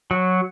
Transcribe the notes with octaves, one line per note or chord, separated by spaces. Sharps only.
F#3